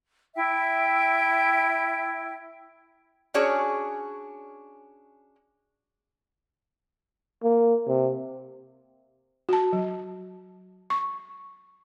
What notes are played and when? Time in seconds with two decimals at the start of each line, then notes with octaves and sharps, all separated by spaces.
0.36 E4 E5 G5
3.34 C#4 D4 F#4 G#4 C#5 G#5
7.43 A#3
7.87 C3
9.49 F#4 A5
9.73 F#3
10.90 C#6